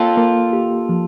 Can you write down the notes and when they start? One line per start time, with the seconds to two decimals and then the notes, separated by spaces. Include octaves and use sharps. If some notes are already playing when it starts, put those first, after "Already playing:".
Already playing: A#3 F4 A4
0.17 A#3
0.53 G4
0.89 F3